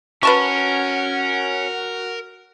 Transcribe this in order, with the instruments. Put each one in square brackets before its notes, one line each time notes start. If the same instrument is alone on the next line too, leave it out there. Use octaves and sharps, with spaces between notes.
[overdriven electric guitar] C#4 [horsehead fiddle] F#4 [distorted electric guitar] A#4 [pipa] B4 A5 C#6